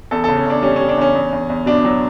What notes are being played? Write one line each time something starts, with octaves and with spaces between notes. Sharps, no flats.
E2 A4
C#3 A4
C#4
E2 D4
G3 C#4
G3 C#4
D4
E2 C#4
E2
E2
E2
B2 D4
F#3